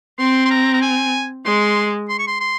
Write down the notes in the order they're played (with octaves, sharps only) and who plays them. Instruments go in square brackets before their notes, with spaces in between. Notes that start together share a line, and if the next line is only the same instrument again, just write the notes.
[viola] C4 [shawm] C6
[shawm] C6
A#5
A#5
G#5
[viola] G#3 [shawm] C6
[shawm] C6
C#6
C6
C6